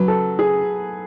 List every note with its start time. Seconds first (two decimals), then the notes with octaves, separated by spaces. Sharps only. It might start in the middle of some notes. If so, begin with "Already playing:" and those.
Already playing: C#3 F#3 B4
0.08 A4
0.39 G#4